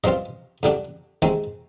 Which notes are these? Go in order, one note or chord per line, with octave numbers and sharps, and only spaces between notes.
G2 F3 C4 F4 D#5
F2 D3 G3 D4
D#2 D#3 G#3 C4